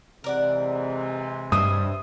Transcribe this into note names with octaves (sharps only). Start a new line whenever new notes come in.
C3 E3 G#3 A#4 D5 F#5
G2 G3 C5 D#5 E5 D#6